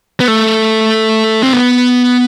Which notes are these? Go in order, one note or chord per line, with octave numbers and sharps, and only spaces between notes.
B3
A3
C4
B3